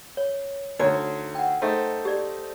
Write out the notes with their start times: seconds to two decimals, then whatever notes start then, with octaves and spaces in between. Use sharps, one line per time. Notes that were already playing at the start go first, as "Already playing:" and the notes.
0.17 C#5
0.79 D2 D#4 C#5 A#5
1.35 F#5 G5
1.62 A3 D#4 C5
2.05 G4 D5